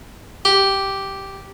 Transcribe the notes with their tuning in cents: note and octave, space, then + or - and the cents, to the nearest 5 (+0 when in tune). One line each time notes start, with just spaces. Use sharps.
G4 -5